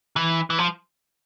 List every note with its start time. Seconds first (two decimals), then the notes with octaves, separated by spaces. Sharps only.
0.16 E3
0.50 E3
0.58 F3